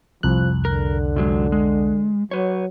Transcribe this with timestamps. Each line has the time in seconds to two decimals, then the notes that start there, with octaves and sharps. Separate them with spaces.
0.23 C2 F2 F3 F#6
0.65 D3 A#4
1.16 C3 F#3 G#3
1.52 G#3
2.31 F#3 B4 C#5